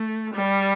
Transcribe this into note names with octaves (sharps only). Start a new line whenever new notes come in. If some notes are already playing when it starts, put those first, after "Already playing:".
Already playing: A3
G3